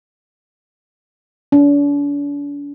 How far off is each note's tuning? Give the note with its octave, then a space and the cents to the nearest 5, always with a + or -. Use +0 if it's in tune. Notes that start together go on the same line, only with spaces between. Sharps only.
D4 -45